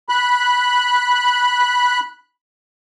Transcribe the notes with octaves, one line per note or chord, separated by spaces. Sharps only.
B5 F#6